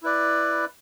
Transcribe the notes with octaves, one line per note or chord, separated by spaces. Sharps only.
E4 B4 D5